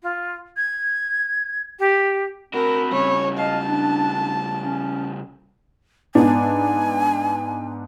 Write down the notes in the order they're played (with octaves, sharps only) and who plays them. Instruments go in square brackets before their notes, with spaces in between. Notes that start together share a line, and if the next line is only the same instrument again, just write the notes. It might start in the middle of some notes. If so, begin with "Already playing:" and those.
[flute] F4
G#6
G4
[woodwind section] C4 B5 [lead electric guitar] D4 F#4 [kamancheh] A#4
[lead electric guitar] C#3 G3 [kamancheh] C#5
[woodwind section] D#5 F5 [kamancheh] A5
[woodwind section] D4
C#4
[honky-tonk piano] G#2 B3 D4 [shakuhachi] G#5